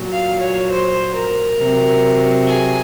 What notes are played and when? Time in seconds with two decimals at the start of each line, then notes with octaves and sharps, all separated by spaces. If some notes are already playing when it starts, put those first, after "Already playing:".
Already playing: A#2 F#3
0.12 F5
0.41 C#5
0.71 C5
1.15 A#4
1.59 C3 F#3
2.46 G#4